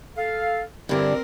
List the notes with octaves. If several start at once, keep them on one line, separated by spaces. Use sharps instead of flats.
A4 F5
G2 D3 C4 D4 E4 A#4